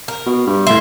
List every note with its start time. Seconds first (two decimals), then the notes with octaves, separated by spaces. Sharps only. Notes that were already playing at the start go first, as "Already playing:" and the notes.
0.08 A#4
0.26 B2
0.47 G2
0.67 A2 E5 C6